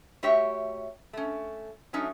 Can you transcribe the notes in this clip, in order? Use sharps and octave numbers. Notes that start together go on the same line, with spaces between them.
A3 F#4 G4 C#5 E5 G5
A3 C#4
F#3 A3 C#4 D#4